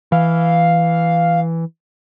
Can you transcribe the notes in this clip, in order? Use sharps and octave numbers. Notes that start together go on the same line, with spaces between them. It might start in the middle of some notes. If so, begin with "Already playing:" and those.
E3 F5